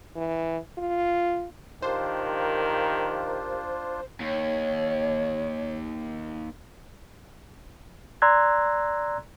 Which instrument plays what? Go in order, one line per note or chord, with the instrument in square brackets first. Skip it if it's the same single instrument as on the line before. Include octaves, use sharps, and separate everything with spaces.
[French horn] E3
F4
[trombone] D#3 [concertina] D4 F4 [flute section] G4 A#4 F5 [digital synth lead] C5
[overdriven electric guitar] D#2 [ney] C#5
[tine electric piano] D5 A#5 C6 E6 F#6 G#6